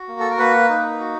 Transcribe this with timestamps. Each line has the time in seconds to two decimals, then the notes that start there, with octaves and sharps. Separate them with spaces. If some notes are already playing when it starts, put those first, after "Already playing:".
Already playing: F#4
0.08 A#3
0.20 A4
0.30 A#4
0.39 A#3 B4
0.69 D#4
1.00 F#4